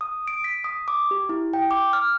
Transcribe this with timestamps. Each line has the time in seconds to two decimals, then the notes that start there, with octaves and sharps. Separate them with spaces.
0.01 D#6
0.28 D7
0.44 B6
0.64 D#6
0.88 D6
1.11 G4
1.29 E4
1.53 G5
1.71 D6
1.93 F6